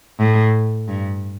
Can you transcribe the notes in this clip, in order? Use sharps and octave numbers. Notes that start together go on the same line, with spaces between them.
A2
G2